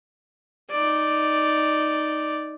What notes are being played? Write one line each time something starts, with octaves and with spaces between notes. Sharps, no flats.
D#4 D5